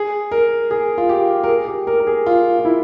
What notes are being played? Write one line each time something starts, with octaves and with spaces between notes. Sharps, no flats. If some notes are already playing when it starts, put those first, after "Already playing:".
Already playing: G#4
A#4
G#4
F4
G4
A#4
G#4
G4
A#4
A#4
G#4
F4
F4
E4